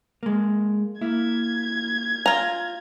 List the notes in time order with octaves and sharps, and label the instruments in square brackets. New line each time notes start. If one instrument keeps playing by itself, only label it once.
[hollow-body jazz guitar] G#3 A#3
[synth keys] A#3 F6 B6 [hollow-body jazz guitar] E4 [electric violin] G#6
[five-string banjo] F4 A#5